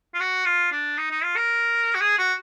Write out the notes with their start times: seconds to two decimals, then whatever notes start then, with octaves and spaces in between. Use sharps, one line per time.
0.14 F4
0.20 F#4
0.45 F4
0.72 D4
0.98 D#4
1.10 D#4
1.24 F4
1.36 A#4
1.95 F#4
2.01 G#4
2.18 F#4